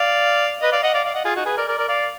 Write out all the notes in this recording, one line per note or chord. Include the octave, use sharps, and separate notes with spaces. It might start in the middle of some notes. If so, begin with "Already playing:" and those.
Already playing: D5 F5
B4 D#5
D5 F5
D#5 F#5
D5 F5
D5 F5
D#5 F#5
F4 G#4
D#4 F#4
G#4 B4
A#4 D5
A#4 D5
A#4 D5
D5 F5